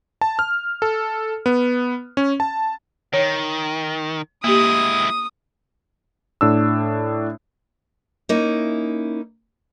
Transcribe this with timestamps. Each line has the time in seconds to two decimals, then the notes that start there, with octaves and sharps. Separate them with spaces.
0.21 A5
0.39 F6
0.82 A4
1.46 B3
2.17 C#4
2.40 A5
3.14 D#3 C#5
4.44 G#3 A#3 E4 G4 D#6
6.41 A2 D4 E6
8.29 A#3 C#4 D#4 E4